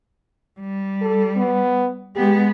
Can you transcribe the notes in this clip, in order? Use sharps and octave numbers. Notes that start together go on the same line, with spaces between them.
G3
A4
B3
G#3 B3 G4